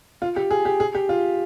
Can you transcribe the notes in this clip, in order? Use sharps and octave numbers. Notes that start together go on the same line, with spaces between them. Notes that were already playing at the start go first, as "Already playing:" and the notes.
F4
G4
G#4
G4
G#4
G4
F4